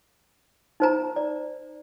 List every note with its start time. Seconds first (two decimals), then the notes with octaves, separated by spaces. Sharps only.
0.80 D#4 C5 A#5
1.16 D5